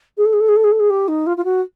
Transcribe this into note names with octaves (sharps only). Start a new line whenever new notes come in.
G#4
A4
G#4
A4
G#4
A4
G#4
A4
G#4
G4
D#4
F4
F4
F#4